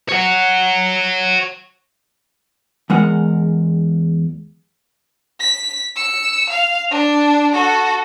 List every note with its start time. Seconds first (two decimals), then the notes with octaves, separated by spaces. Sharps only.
0.09 C#5 F#5
2.90 E2 G#3 A#4 F#5
5.39 B6
5.96 E6 C#7
6.50 F5
6.91 D4
7.53 F#4 A4